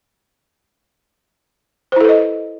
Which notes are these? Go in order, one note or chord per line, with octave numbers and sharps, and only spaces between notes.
E4 A4 B4 C5 D#5